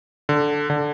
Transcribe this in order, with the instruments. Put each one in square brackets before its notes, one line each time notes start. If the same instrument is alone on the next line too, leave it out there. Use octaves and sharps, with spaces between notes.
[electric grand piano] D3
D3